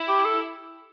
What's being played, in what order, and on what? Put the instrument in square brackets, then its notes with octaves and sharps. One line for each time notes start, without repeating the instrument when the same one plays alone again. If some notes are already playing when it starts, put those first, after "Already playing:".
Already playing: [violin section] E4
[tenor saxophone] G4
A4